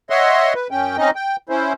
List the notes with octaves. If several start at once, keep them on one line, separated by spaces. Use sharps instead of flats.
C#5 D#5 E5 F#5 C6
B4
F#2 C#4 G5
C4 C#4 D#4 D#5
G5
C#4 E4 C5